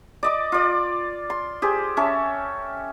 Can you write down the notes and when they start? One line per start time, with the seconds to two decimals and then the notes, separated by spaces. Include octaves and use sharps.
0.23 D5 D#5 D6
0.52 F4 D5
1.30 C6
1.62 G4 G#4 C5
1.97 C#4 A4 E5